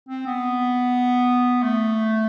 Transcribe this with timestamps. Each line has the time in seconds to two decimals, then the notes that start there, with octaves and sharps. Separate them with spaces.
0.08 C4
0.26 B3
1.63 A3